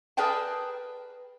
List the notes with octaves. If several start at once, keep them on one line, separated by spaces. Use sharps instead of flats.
G#4 A#4 B4 D5 G5 A5